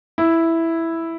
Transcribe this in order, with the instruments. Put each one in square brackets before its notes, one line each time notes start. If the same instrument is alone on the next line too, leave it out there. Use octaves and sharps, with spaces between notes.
[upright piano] E4